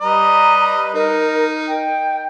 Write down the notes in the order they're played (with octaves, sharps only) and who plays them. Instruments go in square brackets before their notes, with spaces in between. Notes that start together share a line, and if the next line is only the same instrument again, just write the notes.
[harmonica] G3 B4 D#5 [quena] A#5
[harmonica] D#4 [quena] A#4
[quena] G5